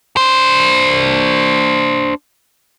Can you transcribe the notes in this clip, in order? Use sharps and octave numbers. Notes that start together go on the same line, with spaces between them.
D4 C5